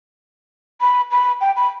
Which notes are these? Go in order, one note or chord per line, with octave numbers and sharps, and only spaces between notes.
B5
B5
G5
B5